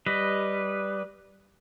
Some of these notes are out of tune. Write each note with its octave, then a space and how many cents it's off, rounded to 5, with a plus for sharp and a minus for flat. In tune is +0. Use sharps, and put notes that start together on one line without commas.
G3 +0 B4 +0 D#5 +0